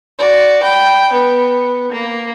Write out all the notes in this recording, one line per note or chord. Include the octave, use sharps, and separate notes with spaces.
F#4 D5
G5 B5
B3
A#3